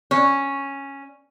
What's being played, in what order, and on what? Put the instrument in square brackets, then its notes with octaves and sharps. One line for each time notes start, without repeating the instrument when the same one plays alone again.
[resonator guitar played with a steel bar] C#4